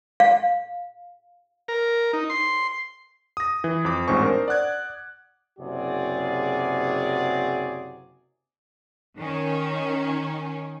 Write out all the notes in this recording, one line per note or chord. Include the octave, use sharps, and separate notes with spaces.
F5
A#4
D#4
C6
D#6 A#6
E3
F2 D6
A1 G#2 C4 C5 G#5 C#6
D4 A#4 C5
D5 F#5 F#6 G#6
F#1 C3 F#4 G#4 D5
D#3 C#4